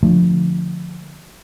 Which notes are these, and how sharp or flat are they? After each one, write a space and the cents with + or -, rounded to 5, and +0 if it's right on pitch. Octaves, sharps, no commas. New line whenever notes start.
D3 +10 F3 +10 A3 +0